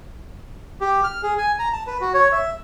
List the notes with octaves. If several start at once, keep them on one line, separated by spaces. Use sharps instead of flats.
G4
F6
G#4
G#5
A#5
A5
B4
F#4
C#5
E5